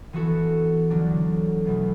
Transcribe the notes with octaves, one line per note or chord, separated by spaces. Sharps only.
E3 B3 F#4 A4
D2 D3 F#3 D4
E2 B2 F#3 A3